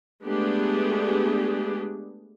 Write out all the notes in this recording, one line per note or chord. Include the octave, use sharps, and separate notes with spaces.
G#3 A3 B3 D4 G4 G#4